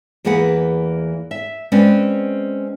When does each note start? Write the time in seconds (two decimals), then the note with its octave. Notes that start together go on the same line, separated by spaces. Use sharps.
0.25 E2 E3 A#3 G#4 B4 F#5
1.31 E5
1.72 G#3 C4 C#4 B4 D5